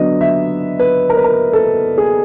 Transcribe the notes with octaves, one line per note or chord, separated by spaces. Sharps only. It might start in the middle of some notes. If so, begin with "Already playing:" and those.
Already playing: D3 F#3 B3 D4 D#5
E5
B4
A#4
B4
A#4
A4
G#4